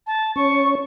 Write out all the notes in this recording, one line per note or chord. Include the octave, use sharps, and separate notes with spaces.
A5
C#4 C#6